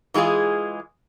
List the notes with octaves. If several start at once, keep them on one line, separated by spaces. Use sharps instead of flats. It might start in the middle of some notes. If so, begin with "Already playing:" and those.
E3 G#3 F4 G#4 F5